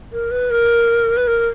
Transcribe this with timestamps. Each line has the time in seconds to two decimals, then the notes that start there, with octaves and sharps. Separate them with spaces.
0.13 A#4
0.31 B4
0.51 A#4
1.17 B4
1.28 A#4